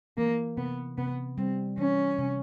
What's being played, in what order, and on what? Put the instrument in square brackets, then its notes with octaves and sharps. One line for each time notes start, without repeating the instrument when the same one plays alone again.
[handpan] E3 [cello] A#3
[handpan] C3 [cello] B3
[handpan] C3 [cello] B3
[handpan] G3 [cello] C4
[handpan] E3 [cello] C#4
[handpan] C3